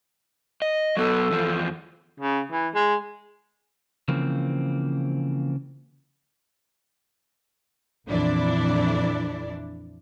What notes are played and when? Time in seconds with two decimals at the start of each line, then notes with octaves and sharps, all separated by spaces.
0.62 D#5
0.97 F#3 B3 A4
1.31 E2 F3
2.20 C#3
2.52 E3
2.75 G#3
4.08 C#3 E3 F3 A#3 C4
8.08 A#1 F2 E3 D4 E4 D5